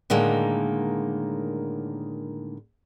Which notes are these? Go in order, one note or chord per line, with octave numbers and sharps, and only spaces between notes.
A2 D3 D#3 G#3 A#3